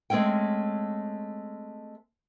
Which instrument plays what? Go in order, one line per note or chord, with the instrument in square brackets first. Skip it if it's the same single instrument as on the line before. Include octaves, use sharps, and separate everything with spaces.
[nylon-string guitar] G#3 A3 C4 C#4 G5